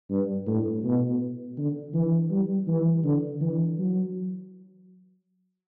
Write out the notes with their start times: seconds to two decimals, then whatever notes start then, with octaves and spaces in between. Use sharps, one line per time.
0.10 G2
0.47 A2
0.84 B2
1.58 D3
1.94 E3
2.31 G3
2.68 E3
3.04 D3
3.41 E3
3.79 F#3